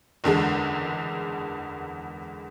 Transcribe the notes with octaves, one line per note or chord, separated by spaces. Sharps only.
F#1 E2 D3 G#3